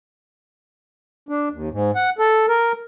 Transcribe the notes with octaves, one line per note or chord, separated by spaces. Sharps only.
D4
D#2
G#2
F#5
A4
A#4